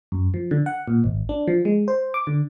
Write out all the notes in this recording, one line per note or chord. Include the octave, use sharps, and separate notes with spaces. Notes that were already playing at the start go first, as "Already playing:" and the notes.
F#2
F3
D3
F#5
A#2
G#1
D4
F3
G#3
C5
D6
D3